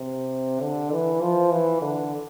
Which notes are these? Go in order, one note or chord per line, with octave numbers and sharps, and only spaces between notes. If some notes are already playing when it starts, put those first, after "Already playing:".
Already playing: C3
D3
E3
F3
E3
D3